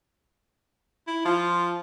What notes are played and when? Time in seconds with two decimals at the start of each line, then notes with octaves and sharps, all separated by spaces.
1.07 E4
1.25 F3 F4